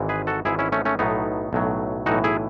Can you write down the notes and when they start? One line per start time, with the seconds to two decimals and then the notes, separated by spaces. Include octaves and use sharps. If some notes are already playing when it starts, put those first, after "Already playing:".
Already playing: G#1 G#2 E3
0.09 G#4 B4
0.27 F#4 A4
0.45 G#1 G#2 E3 E4 G#4
0.59 C#4 E4
0.72 A3 C#4
0.85 A3 C#4
0.99 B1 A2 F#3 B3 D#4
1.53 B1 A2 F#3
2.06 B1 A2 E3 D#4 F#4
2.24 E4 G#4